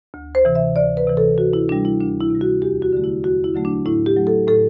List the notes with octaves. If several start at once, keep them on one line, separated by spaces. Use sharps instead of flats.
D2
C5
C3 E3
E5
D2 D5
B4
C3 E3
A4
D2 F#4
E4
C3 G3 D4
E4
D2 D4
E4
C3 G3
F#4
E2 G4
F#4
D3 F#3 A3
E4
E2 F#4
E4
D3 F#3 A3
D4
A2 E4
G4
F#3 A3
A4
A2 A4